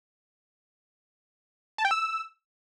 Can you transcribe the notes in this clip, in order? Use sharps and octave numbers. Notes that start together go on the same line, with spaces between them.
A5
G5
E6